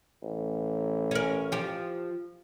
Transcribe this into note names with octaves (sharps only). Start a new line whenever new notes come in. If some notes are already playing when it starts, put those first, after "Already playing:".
A1
C#4 A#4
F3 G4